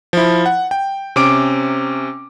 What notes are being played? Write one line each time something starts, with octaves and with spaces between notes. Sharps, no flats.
F3 E4
F#5
G5
C3 C#4 D6 D7